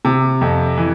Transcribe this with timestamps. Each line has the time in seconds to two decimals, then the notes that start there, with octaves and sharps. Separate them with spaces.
0.05 C3
0.41 F2
0.78 E3